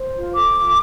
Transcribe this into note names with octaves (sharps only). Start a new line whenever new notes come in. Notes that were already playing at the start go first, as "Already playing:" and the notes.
Already playing: C5
F4
A4 D6
F4